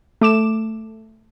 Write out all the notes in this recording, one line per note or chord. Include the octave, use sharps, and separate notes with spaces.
A3 D6 E7